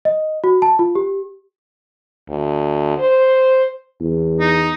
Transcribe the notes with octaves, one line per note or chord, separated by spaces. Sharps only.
D#5
F#4
A5
F4
G4
D2
C5
E2
D#4